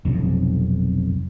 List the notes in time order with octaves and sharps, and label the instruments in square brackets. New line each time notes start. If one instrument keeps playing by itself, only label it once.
[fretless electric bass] F1 B1 F2